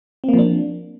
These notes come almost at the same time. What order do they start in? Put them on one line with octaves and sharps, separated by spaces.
C4 A#3 F3 D4